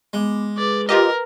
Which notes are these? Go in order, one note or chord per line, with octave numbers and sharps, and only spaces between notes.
G#3 B3 D6
G#4 B4 D5 D6
F4 G4 A#4 B4 D#5 A#5